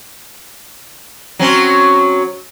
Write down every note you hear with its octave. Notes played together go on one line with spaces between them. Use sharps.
F#3 C4 C#4